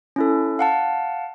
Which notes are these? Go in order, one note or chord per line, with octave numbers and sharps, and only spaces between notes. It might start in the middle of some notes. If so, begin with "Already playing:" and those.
C#4 E4 A4
F5 F#5 A5